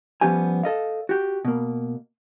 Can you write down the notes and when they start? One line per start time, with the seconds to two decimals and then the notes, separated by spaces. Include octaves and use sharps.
0.21 F3 G3 B3 C#4 G4 G#5
0.63 A4 D#5 F5
1.09 F#4 G4
1.45 B2 A#3